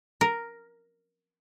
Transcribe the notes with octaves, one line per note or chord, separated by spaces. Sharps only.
A#4